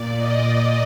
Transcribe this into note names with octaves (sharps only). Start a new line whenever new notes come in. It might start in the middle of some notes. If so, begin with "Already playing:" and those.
Already playing: A#2 D5
D#5